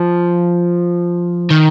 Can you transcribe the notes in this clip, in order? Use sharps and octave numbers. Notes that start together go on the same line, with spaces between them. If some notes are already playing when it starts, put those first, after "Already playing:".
Already playing: F3
D#3